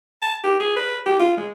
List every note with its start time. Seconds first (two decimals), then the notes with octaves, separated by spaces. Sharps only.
0.22 A5
0.44 G4
0.60 G#4
0.76 B4
1.06 G4
1.20 F4
1.37 G#3